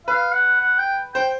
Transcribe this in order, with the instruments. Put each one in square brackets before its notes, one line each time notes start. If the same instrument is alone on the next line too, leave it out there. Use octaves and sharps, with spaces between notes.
[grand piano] B4 [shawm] F5
[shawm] F#5
F#5
G5
[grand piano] C5 [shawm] G5